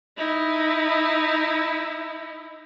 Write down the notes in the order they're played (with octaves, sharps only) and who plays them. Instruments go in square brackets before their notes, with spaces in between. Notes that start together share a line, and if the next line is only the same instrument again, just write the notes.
[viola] D#4 E4